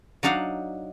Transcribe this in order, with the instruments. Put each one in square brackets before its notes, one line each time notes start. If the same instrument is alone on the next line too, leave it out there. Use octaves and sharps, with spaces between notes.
[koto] F#3 D4 D#4 F5 F#5